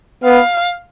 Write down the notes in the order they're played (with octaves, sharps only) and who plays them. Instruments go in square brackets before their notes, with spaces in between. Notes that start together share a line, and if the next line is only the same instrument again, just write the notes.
[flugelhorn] B3 [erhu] F5